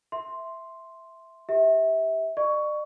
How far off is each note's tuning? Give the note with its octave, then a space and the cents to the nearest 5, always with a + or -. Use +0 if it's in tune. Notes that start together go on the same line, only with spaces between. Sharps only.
E5 -5 C6 +0
G4 +15 E5 -25
D5 +40 C#6 +15